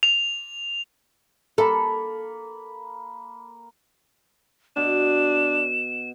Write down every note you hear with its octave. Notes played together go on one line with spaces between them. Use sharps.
F7
A#3 A4 B5
B2 D4 E7